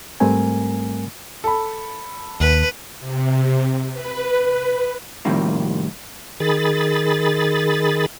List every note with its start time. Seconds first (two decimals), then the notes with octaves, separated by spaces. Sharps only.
0.20 G#2 G3 A3 C4 A#4 G#5
1.44 A4 B5
2.40 D#2 B4
2.99 C3
3.93 B4
5.25 A2 C3 D#3 F3 G3 A#3
6.40 D#3 G#4 B5 A6